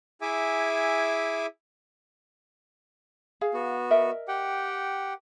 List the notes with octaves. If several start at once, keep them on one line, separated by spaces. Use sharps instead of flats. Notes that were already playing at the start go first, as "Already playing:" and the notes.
E4 G#4 E5 G#5 D6
G#4 F5
B3 F#4
A#4 D#5 E5
G4 F#5 G5